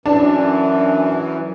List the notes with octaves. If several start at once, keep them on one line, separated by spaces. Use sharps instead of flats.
F#2 E3 D4